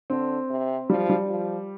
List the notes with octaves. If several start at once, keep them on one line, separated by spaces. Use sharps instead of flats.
D3 C4
C3
F3 G3
G3
F3